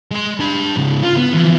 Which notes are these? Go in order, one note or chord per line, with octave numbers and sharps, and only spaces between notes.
G#3 C6
D4 B5
G#2 C#3
F4
B3
E3 F3